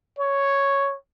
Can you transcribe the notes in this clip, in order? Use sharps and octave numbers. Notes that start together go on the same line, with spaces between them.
C#5